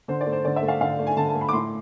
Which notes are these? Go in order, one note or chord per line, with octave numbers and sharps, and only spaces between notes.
D3 C5
D5
A3
C5
D3 D5
E5
A3
F5
D3 F5
A3
G#5
D3 A5
A5
A3
B5
D6
A2 C6